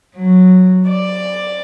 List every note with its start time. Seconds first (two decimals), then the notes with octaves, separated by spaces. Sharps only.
0.15 F#3
0.89 D5